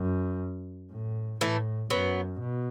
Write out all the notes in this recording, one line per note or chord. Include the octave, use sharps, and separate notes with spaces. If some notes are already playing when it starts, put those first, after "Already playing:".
Already playing: F#2
A2
A2 E3 A3
F#2 F#3 B3
B2